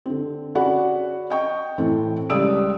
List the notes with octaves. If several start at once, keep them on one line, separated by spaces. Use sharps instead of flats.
D3 C4
C#4 F#4 G#4 D5 F#5 B5
D#5 G5 C#6
A2 E3 C4 A4
C#2 G3 D5 D#6 E6 D7